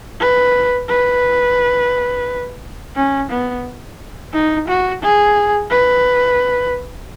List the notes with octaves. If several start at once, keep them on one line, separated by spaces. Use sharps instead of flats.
B4
B4
C#4
B3
D#4
F#4
G#4
B4